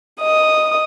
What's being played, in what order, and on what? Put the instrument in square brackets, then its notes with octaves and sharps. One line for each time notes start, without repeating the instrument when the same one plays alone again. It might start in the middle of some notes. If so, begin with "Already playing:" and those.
[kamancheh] D#5 D#6